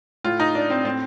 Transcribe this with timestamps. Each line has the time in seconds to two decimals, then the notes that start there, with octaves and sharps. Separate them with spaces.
0.24 A2 F4
0.40 D#4
0.55 D4
0.70 C4
0.85 A2 C4